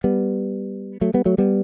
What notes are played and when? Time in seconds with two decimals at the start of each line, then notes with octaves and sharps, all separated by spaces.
0.04 G3 B3
1.01 F#3 A3
1.14 G3 B3
1.25 F#3 A3
1.38 G3 B3